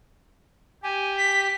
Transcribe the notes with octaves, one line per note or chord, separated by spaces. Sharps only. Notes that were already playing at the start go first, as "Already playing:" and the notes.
G4 G#5
B6